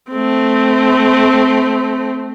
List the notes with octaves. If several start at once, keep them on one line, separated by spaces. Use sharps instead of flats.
A3 C4